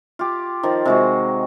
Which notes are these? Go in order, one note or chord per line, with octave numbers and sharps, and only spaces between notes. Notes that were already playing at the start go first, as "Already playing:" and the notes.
F4 G4
D#3 F3
C3 G#3 F#4